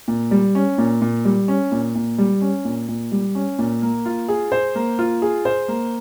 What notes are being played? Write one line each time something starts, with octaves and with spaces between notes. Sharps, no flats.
A#2
G3
C#4
A#2
A#2
G3
C#4
A#2
A#2
G3
C#4
A#2
A#2
G3
C#4
A#2
A#3
F4
G#4
C5
A#3
F4
G#4
C5
A#3